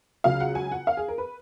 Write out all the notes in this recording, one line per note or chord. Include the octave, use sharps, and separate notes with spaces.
C#2 C#3 F#3 F5
F#5
G#5
F#5
F5
G#4
A#4
B4